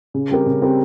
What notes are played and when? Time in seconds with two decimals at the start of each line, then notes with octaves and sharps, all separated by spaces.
0.14 C#3
0.30 G3 C4 G4 A#4
0.46 C#3
0.61 G3 C4 G4 A#4